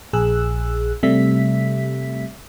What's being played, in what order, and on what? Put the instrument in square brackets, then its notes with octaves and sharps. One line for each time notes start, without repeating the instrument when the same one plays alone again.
[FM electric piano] A#1 G#4 E6 F#6
C3 G3 A3 E5 B6